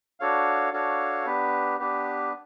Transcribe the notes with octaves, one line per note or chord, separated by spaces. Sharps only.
D4 F#4 A4 C#5 F5
D4 F#4 A4 C#5 F5
B3 D4 G4 B4
B3 D4 G4 B4